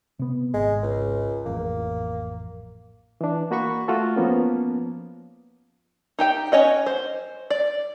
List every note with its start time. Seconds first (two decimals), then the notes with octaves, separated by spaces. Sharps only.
0.19 C3 B3
0.54 G#1 G#3
0.83 C#2
1.46 A1 F2 A#3
3.21 E3 D4
3.51 A#3 F#4 B5 C#6
3.88 A3 F4 F#4 A4
4.16 F3 A#3 B3 C#4
6.19 D#4 G4 G5
6.52 C#4 C#5 D#5 F#5
6.86 C5
7.50 D5